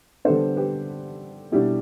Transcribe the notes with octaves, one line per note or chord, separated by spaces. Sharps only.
D3 G3 B3 D4 A4 C5
G4 B4
B2 G3 D4 E4 G4